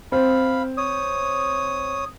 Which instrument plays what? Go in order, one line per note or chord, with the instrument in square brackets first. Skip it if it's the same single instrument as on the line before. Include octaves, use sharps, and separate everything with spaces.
[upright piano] C4 [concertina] F5 B5
[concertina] C#5 D#6